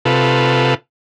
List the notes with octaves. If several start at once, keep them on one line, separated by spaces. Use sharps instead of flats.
C3 F4 A4 B4